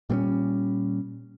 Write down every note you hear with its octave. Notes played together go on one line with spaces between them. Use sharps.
A#2 G3 A#3 C#4